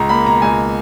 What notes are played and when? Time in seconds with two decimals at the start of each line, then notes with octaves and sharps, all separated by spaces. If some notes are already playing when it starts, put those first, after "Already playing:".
Already playing: C#2 A#5
0.09 A#3 B5
0.25 B2 A#5
0.42 C#2 G#5